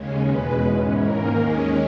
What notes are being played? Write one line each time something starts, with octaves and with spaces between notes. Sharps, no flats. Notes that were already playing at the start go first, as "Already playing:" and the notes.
Already playing: D#2 C#3 G#3 C#4
E2 B2 G#3 B4
G#2 E3 G#3 C#4
G#2 D#3 A#3 A#4
D#2 D#3 G#3 C#4